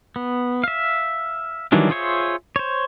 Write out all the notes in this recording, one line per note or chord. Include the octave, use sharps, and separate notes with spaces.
B3
E5 F5
D#3 E3 F#3 G3 D4
F4 G#4 C5 C#5 E5
C5 C#5